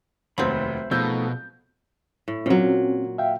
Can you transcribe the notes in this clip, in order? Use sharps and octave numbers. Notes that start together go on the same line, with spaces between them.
F1 D#2 F#3 C4 C5 E5 B5
B2 F3 A3 D#4 G#4 E6 G6
A2
A#2 F#3 C4 C#4
E5 F5 G5